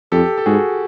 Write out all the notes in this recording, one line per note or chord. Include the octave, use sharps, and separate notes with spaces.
F2 G4 A4
A4
G#2 F#4 G#4